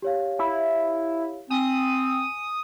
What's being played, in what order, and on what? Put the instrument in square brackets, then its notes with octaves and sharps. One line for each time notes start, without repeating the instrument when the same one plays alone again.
[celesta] G4 C#5 F5
[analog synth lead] E4
[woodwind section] C4 [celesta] G#5 [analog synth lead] D#6